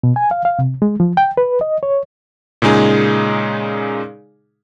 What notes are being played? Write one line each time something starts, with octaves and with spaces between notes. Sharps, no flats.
B2
G#5
F5
F5
C3
G#3
F3
G5
B4
D#5
C#5
A#2 C#3 G#3 D#4 G#4